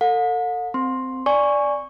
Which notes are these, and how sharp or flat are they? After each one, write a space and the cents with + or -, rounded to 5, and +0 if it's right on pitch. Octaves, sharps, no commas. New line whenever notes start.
A4 +35 F#5 -45
C4 -10 C6 +5
D5 -5 G#5 +0 C#6 +0